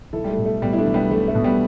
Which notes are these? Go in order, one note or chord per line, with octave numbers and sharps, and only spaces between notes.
B1 E4 A4
G3
A3
B2
A3
B2 G3 B3
E4
A3 D4
B1
G3 B3
B1 A3
A3
B2
G3 B3